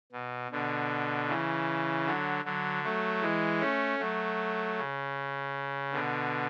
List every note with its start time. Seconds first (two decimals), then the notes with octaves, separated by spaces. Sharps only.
0.12 B2
0.51 B2 D3
1.28 C#3 E3
2.06 D3 F#3
2.44 D3 F#3
2.83 F#3 A3
3.22 E3 G#3
3.60 A3 C#4
3.99 F#3 A3
4.77 C#3
5.92 B2 D3